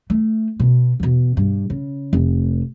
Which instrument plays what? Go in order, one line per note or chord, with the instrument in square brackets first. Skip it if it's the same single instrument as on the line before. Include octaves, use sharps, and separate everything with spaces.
[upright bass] A3
B2
E2 B2
G2
C#3
F1